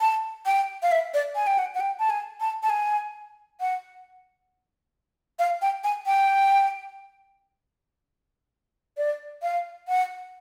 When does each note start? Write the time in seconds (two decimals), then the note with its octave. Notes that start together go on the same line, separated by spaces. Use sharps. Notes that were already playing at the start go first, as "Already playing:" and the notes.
0.01 A5
0.46 G5
0.83 F5
0.92 E5
1.14 D5
1.35 G#5
1.47 G5
1.58 F#5
1.75 F#5
1.80 G5
1.99 A5
2.10 G#5
2.41 A5
2.63 A5
2.70 G#5
3.60 F#5
5.39 F5
5.62 G5
5.84 G#5
6.06 G5
8.97 D5
9.43 F5
9.88 F#5